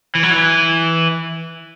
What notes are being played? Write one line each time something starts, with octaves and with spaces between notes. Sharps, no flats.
E3
F#3
E3